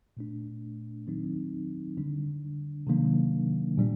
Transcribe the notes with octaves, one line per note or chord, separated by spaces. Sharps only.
A#2 A3 D4
D#3 F#3 C4 D#4
D3 G3 D4
C3 D#3 F#3 A#3 D4
A#2 G3 D4